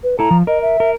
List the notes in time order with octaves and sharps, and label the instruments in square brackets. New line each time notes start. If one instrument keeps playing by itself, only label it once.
[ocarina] B4
[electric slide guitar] E4 A4 [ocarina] A#5
[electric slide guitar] F3
[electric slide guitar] A#4 [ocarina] D#5
[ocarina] E5
[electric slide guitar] A#4